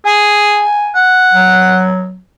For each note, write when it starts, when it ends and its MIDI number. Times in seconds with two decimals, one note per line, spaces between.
0.06 0.63 68
0.06 0.95 80
0.95 1.82 78
1.33 2.19 54